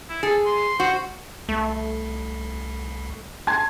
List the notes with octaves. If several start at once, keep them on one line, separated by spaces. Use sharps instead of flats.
E4
G#4 A4
C6
F#4 C5
C2 A3
A5 C6 G#6